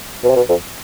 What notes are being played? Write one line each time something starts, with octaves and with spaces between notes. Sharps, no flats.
B2
C3
B2
F2